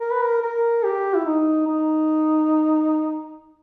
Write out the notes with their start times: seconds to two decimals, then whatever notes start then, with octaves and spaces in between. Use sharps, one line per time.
0.01 A#4
0.12 B4
0.23 A#4
0.42 A#4
0.83 G4
1.14 E4
1.26 D#4
1.67 D#4